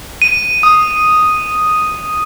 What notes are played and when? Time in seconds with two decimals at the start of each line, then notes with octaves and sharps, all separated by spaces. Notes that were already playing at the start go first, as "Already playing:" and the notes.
0.22 D#7
0.63 D#6